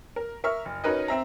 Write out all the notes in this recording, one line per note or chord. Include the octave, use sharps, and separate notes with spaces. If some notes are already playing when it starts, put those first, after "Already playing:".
A#4
A#4 E5 C#6 F6
F#1
C#4 D#4 F#4 A#4 B4 D#5
C4 E5 A#5